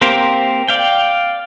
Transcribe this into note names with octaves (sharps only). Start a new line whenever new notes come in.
A#3 C4 G4 A#4 C5
D5 F5 G5